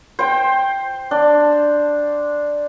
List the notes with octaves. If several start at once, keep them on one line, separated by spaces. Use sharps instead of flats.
C5 G5
D4